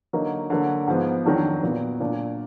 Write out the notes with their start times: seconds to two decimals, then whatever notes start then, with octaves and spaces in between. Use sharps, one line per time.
0.13 D3 F#3 A#3 D#4
0.50 D3 F#3 A#3
0.87 G#2 F3 B3
1.26 F2 D#3 F#3 D4
1.63 A#2 F#3 B3
2.00 A#2 F#3 D4